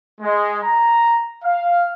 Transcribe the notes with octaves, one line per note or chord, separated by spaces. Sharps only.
G#3
A#5
F5